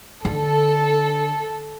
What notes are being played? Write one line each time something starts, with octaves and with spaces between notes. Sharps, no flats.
D3 A4